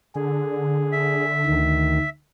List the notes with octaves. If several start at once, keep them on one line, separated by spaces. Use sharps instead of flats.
D3 G#4
E5
D2 D#3